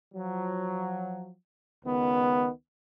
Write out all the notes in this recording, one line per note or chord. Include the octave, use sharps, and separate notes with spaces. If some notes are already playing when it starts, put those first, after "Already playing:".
F3 F#3
C#2 D#3 B3